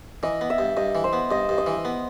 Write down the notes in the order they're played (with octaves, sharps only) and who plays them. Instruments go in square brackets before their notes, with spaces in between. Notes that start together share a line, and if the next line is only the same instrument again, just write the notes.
[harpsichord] E3 [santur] D#5
[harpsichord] B3
[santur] E5
[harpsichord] G2
[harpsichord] G2 [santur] D#5
[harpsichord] E3
[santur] C5
[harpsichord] B3
[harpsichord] G2 [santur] D#5
[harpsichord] G2
[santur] D#5
[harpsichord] E3
B3